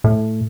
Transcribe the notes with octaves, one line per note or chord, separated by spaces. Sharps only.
A2